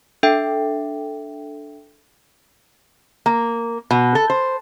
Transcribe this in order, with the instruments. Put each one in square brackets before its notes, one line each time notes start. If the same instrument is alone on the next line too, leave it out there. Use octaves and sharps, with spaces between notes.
[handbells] D4 A4 E5 G5
[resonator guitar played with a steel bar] A#3
B2
A4
C5